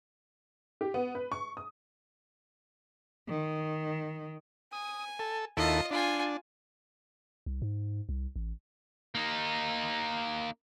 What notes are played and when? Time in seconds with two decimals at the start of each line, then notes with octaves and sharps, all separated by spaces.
0.81 G4
0.94 B3
1.15 B4
1.32 C#6
1.57 D#6
3.29 D#3
4.73 G#5 D#6
5.19 A4
5.57 D#2 E4 F4 A4 D#5
5.91 D4 F4 G#5
7.46 C2
7.62 G#2
8.09 C2
8.36 A1
9.15 A#3 D#4